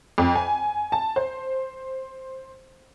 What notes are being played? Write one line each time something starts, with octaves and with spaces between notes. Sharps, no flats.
F2
G#5
A5
C5